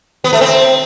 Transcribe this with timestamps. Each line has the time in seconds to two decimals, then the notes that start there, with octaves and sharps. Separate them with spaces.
0.24 B3
0.33 A3
0.41 C4